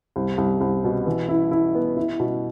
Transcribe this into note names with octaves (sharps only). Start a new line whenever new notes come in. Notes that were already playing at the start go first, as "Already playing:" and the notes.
C2
C2
C2
B2
E3
E4
E4
B3
E4
B2